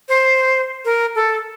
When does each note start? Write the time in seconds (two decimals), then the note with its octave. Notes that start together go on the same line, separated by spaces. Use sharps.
0.09 C5
0.85 A#4
1.15 A4